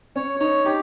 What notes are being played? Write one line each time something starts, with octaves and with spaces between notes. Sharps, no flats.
C#4 C#5
D#4 C#5
D#4 G4